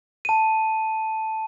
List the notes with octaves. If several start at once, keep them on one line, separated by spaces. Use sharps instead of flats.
A5 D#7